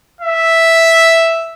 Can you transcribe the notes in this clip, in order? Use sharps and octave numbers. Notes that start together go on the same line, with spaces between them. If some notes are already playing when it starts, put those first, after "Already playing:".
E5